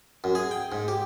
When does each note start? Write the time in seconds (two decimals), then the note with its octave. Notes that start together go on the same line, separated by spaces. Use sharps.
0.24 F#2
0.35 G#4
0.51 G5
0.72 G#2
0.88 G4